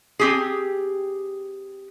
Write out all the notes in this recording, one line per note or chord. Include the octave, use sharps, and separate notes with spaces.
C4 G4 G#4